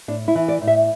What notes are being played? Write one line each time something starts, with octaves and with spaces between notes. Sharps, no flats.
A2 D4
E4
E3
D5
A2
E5